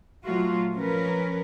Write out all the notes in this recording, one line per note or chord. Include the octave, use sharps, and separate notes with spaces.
A#2 F#3 A3 F4 F#4
F3 C#4 A#4 B4